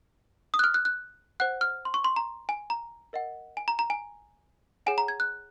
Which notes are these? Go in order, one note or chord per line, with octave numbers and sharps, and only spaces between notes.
D#6
F#6
F6
F#6
F#6
C5 F#5 F#6
F6
C6
C#6
C6
A#5
G#5
A#5
A#4 D#5 F#5
G#5
A#5
A#5
G#5
G#4 C#5 F#5 G#5
A#5
G#6
F#6